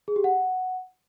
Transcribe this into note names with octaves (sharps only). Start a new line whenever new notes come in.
G#4
G4
F#5